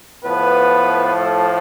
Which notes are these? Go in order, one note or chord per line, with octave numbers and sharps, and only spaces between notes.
A2 F3 B3 B4
A3 A4